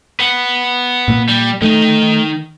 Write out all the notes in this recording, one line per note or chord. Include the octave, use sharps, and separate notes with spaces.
B4 F#5
A#2 A#3
G3
D#3 A3 D#4